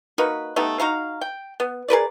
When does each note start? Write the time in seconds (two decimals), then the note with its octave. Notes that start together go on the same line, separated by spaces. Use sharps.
0.18 A#3 D#4 F#4 B4
0.56 A3 B3 D#4 G4
0.80 D#4 F#4 F5 A#5
1.21 G5
1.60 B3
1.88 G#4 A#4 B4 D5